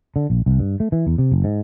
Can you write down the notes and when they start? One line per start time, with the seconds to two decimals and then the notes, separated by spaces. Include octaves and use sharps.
0.16 D3
0.30 A#1
0.46 C2
0.59 G2
0.80 A3
0.92 E3
1.07 E2
1.18 C3
1.32 F#1
1.44 G#2